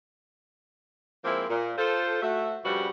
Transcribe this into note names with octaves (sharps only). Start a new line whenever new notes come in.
F3 G#3 A#3 C4 E4 A#4
A#2
F4 A4 C5
A3 F#4 E5
G2 C#3 F3 G3 F#4 B4